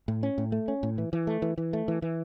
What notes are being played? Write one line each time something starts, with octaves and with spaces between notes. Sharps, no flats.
A2
C#4
A2
A3
C#4
A2
E3
E3
A3
E3
E3
A3
E3
E3